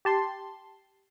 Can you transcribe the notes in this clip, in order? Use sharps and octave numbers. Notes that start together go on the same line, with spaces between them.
G4 A5 C6